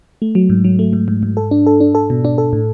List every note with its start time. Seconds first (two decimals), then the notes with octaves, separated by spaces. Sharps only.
0.22 A3
0.35 F#3
0.50 G#2
0.64 F#3
0.79 A3
0.93 G#2
1.08 G#2
1.23 G#2
1.37 A4
1.51 D4
1.66 A4
1.80 D4
1.95 A4
2.10 B2
2.25 D4
2.38 A4
2.53 A2